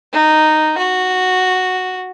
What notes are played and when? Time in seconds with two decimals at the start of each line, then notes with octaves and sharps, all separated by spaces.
0.13 D#4
0.77 F#4